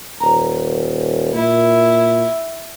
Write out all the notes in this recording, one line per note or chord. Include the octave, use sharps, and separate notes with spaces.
D#1 A#5
A#2 E4